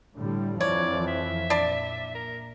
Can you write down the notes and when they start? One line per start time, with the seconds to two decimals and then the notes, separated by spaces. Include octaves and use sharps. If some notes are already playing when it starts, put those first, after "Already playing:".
0.16 A2 D3 G3
0.61 F2 E3 F3 C#5 D5
1.07 E5
1.50 A#2 D4 D5
2.15 A#4